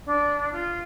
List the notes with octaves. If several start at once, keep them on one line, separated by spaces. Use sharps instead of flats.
D4
F4